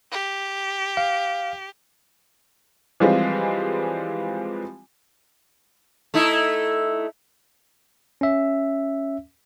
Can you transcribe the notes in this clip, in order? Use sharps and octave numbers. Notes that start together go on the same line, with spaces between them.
G4
F5
E3 F3 G3 G#3 C4 F4
A3 D#4 E4
C#4 E5